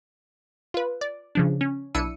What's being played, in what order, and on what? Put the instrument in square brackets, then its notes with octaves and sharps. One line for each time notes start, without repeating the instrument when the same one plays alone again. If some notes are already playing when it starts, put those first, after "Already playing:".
[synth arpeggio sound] F4 B4
D5
C#3 F3 D4
C#4
B1 D4 E4 E6 C#7 D#7